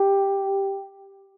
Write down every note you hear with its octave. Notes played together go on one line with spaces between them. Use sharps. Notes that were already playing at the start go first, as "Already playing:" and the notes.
Already playing: G4